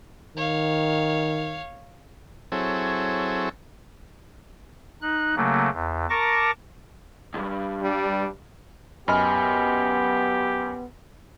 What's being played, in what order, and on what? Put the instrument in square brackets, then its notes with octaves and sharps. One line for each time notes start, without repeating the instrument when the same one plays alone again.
[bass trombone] D#3 [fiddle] C#5 F5
[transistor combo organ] F#3 C4 E4 G#4 A4 C#5
[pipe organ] D#4 F#6
C#3 F#3 A3 A#3
E2
A#4 A5 A#5 C#6 D6 A#6
[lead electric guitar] C#2 G2
[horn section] G3 D4
[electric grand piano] F#2 D#5 F6 [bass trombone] B3 [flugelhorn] G4 [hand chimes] G#5 B5